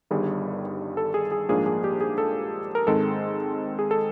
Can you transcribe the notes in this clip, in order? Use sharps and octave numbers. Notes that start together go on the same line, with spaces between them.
G1 G2 D#3 G3 G#4
A4
G#4
G#4
A#1 G#2 F3 A#3 D4 G#4
G#4
G4
G#4
A4
A#4
G#2 D#3 G#3 C4 A4
G#4
A4